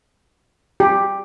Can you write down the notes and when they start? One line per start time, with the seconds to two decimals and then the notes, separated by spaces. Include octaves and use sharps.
0.80 G4